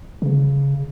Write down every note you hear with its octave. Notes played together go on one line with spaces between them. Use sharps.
C#3